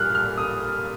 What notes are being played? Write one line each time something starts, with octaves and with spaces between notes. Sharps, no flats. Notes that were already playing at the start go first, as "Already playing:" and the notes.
Already playing: A#2 G3 F6 F#6
F6
D#6